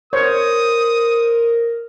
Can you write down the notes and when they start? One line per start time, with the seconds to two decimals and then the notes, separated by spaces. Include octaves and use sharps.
0.13 A#4 C5 C#5 D#6